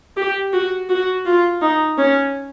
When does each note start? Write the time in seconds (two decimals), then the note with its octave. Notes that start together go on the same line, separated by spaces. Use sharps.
0.17 G4
0.53 F#4
0.89 F#4
1.25 F4
1.62 D#4
1.98 C#4